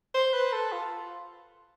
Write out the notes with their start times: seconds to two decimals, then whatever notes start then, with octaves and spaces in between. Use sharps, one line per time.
0.14 C5
0.33 B4
0.52 A4
0.72 F4